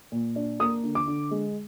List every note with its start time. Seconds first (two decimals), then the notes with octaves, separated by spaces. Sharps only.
0.12 A#2
0.36 D4
0.60 A#3 D#6
0.83 D3
0.95 D6
1.07 D3
1.31 G#3